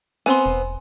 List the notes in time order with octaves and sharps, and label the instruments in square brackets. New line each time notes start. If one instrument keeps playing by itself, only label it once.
[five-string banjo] B3 C4 [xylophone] G#5 C6
[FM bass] E1